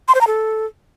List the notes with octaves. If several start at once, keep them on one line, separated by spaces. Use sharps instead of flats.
C6
C5
A#5
A4